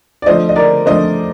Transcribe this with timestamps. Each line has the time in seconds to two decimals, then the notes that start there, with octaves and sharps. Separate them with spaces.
0.22 D5
0.26 F3 A3 D4 F4 C5 D#5
0.49 D#5
0.56 A#4 D5
0.86 F3 A3 D4 F4 C5 D#5